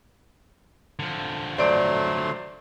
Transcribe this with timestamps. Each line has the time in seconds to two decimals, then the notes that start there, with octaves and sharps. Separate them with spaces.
0.99 D3 F3
1.58 F#3 A3 C5 D5 C6 D7